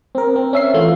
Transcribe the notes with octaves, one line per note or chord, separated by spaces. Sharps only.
C4 A#4
C4
C#4 E5 C7
E3 A3 F4